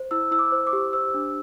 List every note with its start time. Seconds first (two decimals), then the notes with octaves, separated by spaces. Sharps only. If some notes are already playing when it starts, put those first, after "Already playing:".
Already playing: C5
0.11 E4 E6
0.32 E4 E6
0.39 D6
0.52 C5
0.67 D6
0.73 G4
0.93 C5 E6
1.14 D4